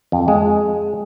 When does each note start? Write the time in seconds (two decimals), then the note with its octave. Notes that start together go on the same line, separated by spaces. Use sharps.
0.12 F2
0.28 G#3